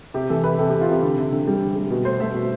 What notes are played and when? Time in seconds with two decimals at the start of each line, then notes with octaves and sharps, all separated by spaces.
0.14 C3 G4
0.29 E3 A4
0.44 C3 B4
0.58 C3 A4
0.69 C3 G4
0.81 F4
0.88 C3 G4
1.03 D3
1.18 D3
1.32 D3
1.48 G3
1.62 D3
1.76 G3
1.91 B2
2.05 A3 C5
2.20 A3 E5
2.34 B2